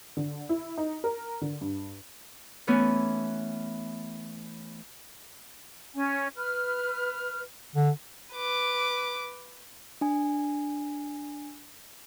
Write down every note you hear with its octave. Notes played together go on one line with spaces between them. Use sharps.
D3
E4
D#4
A#4
D3
G2
E3 A3 B3 C#4
C#4 G#5
B4 F6
D3
B4 D6
D4 G#5